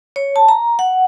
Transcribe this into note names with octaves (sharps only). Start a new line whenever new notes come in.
C#5
A5
A#5
F#5